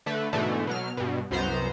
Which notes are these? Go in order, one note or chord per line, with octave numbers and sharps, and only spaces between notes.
D3 A3 B4
G#2 B2 D3 E3 A3
B2 F#3 F6
G2 B2
C2 F#2 B3 C5 A#5